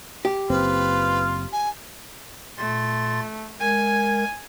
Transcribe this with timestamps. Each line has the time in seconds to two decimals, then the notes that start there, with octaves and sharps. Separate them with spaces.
0.25 G4
0.50 F#1 C4 F4 B4
1.52 G#5
2.58 A#2 A3 C6 A6
3.60 G#3 A#4 G#5 G#6